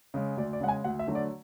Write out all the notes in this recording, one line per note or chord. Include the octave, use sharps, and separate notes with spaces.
C#3 G#3
D2 D5
D5
C#3 G#3 F#5
G#5
D2 F#5
E5
D3 F#3 A3
D5